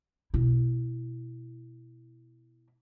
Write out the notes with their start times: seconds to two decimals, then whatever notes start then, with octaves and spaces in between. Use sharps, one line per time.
0.34 B2 E4